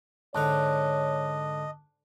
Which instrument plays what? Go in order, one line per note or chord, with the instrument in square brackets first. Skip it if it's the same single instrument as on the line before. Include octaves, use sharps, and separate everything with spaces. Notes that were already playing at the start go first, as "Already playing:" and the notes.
[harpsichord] G#2 D3 F5 [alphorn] C#5 [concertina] D#5 [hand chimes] A5 D6 F#6